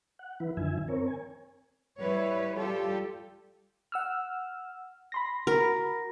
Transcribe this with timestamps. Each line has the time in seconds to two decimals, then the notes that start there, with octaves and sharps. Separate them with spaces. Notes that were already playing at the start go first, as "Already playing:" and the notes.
0.19 F#5
0.40 E3 E4 B4
0.57 F#2 D3 D#3 F3 E5 G#5
0.88 C4 A#4 C#5
1.08 G#5
2.00 G3 E4 B4 C#5
2.57 G3 F4 G4 A4
3.92 F#5 E6 F6
5.12 B5 C6 A#6
5.47 F#4 A#4 B5